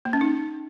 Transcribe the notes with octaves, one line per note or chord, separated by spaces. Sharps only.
A#3
C#4
D#4